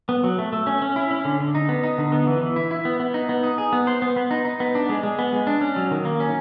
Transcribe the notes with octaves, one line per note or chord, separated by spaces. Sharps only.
B3
F#3
A3
A3
C#4
C#4
E4
C#4
D3
D3
D#4
B3
D#4
D3
B3
E3
E3
E4
E4
B3
B3
D#4
B3
D#4
G#4
B3
C5
B3
B3
D#4
D#4
B3
D4
G#3
G#3
B3
G#3
D4
C#4
F#3
D#3
A#3
C#4